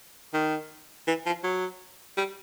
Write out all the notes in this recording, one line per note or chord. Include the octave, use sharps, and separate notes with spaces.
D#3
E3
F3
F#3
G3